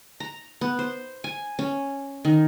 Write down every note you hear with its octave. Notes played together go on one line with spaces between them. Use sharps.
A#5
B3
C5
G#5
C#4
D#3